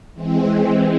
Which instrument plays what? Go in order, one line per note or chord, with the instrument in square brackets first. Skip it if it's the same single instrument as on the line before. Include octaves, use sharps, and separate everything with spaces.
[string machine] E3 G#3 C4